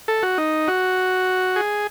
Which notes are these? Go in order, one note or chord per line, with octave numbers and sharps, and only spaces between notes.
A4
F#4
D#4
F#4
G#4